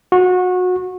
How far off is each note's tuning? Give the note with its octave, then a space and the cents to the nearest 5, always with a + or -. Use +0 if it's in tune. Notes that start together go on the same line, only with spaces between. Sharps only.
F#4 -25